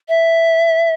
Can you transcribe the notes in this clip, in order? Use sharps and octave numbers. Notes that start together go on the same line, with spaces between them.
E5